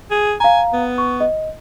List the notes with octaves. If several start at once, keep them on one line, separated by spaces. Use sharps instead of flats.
G#4
F5 G#5 A#5
B3
C#6
D#5